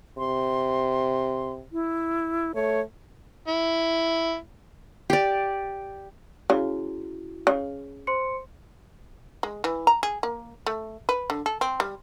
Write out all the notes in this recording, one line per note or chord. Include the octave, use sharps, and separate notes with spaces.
C3 C6
E4
A3 C#5
E4
G4 D5
C#3 E4 F#4
C#3
C5 C6 C#7
G#3
E3
A#5
G#4
A#3
A3
B4
D3
A4
C4
G3